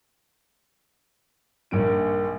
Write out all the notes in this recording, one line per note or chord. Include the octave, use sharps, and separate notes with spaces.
A#1 G2 D#3 D7